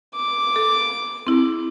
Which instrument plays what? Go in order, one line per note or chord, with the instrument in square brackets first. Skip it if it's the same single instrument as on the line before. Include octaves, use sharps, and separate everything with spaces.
[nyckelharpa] D6
[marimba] A4
C4 E4 G#4